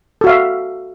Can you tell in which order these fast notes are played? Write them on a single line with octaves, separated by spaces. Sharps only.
A4 F#4 F5 E5